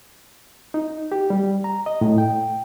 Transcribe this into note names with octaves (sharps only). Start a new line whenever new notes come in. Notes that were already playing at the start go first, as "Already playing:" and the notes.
D#4
G4
G3
A#5
D#5
A2
G5